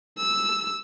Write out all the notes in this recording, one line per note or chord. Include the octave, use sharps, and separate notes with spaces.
E6